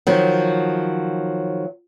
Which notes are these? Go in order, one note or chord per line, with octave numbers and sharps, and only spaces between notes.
D#3 F3 F#3